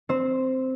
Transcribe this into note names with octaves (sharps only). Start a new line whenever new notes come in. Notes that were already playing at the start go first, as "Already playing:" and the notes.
C4 C5